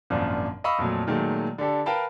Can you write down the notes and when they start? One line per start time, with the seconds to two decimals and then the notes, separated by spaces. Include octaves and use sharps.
0.10 G#1 F#2 A#2 F3 D4
0.64 D#5 F5 B5 C#6 D#6 E6
0.78 F2 A#2 F#3 A3
1.07 A#2 D#3 F#3 G#3 A3
1.58 D3 D4 G4 A4
1.86 A#4 B4 F5 G5 A5 B5